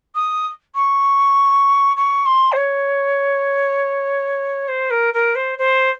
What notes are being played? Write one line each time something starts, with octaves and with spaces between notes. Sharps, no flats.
D#6
C#6
C#6
C6
C5
C#5
C5
A#4
A#4
C5
C5